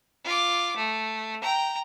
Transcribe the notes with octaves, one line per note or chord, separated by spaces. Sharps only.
F4 D6
A3
G5 A#5